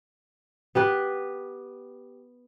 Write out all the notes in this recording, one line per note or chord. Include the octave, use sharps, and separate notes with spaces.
B3 G4 B4